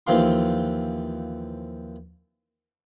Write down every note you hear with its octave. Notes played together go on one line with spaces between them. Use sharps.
D#2 E3 F3 C4 F5 C6